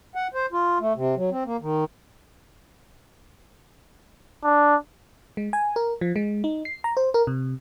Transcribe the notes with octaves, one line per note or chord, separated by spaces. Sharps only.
F#5
C5
F4
A3
C3
F#3
C4
A#3
D#3
D4
G#3
G#5
A#4
F3
G#3
D#4
C7
A#5
C5
A#4
C3